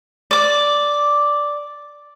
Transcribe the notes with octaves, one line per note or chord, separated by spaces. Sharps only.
D5 D6